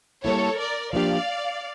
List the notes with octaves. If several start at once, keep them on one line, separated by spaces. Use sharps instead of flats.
G3 A#3 E4 A4 C#5
A#4 D5
F3 A#3 D4 G4 D5 F5